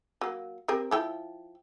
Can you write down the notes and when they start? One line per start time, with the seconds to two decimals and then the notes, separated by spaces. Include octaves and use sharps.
0.21 F#3 A#3
0.68 C4 G4 A#4
0.91 F3 E4 G5